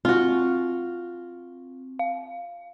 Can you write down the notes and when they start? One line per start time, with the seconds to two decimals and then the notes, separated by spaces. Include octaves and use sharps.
0.05 C4 F4 F#4
1.99 F5